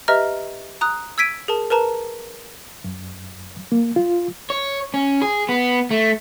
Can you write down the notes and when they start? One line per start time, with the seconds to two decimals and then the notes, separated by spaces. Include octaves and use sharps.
0.08 G4 B4 D#5 E5 A#5 F6
0.81 A#5 D#6 F#6
1.18 E6 G#6 B6 D7 D#7
1.48 G#4 A#4 A5
1.70 A#4 B4 A5 A#5
2.84 F#2
3.72 A#3
3.96 F4
4.50 C#5
4.94 C#4
5.22 G#4
5.49 B3
5.91 A3